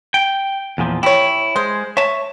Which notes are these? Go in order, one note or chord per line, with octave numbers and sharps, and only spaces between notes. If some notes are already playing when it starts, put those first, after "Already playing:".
G5
E2 A#2 F3
E4 G4 C#5
G#3 C5
C#5 E5 A5